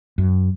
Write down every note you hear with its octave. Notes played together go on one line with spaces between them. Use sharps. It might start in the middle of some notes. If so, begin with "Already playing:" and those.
F#2